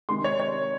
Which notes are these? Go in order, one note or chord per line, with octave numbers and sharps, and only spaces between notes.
C3 D#3 G#3 C6
C#5
C#5